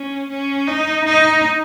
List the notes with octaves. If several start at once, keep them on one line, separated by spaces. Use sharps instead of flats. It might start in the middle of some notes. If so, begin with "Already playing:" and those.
Already playing: C#4
C#4
D#4
D#4